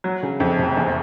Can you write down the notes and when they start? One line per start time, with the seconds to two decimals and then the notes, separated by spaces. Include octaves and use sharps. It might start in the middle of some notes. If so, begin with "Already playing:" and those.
0.04 F#3
0.23 C#3
0.40 F2
0.59 F1
0.77 E2